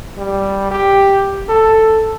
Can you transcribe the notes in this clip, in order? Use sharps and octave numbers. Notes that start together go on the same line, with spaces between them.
G3
G4
A4